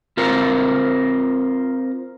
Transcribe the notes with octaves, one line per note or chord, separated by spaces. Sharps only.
C4 F4 A#4 C5